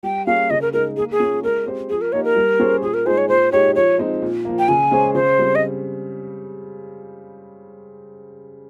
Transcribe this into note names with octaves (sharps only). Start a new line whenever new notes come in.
G3 G5
A#3 C#4 G#4 F5
C#3 D#5
A#4
G#3 D#4 A#4
A#3 G#4
G#4
C#4 F4
G#3 A#4
C4 G4 C5
F3 G#4
A#4
A#3 D#4 G4 C#5
A#4
G3
C#4 G#4 C5
A#2 G#4
A#4
G#3 D#4 G#4 C5
C#5
A#2 C5
G#3 D#4 G4 C#5
F3 C#5
G#3 C4 D#4
A#2
F3 A#3
G5
C#3 G#5
G#3 C#4 G#4 C5
C#3 C5
G3 C4
D#5